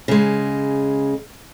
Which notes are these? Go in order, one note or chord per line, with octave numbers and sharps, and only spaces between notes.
C#3 G#3